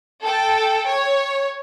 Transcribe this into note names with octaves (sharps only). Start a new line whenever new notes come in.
A4 G5
C#5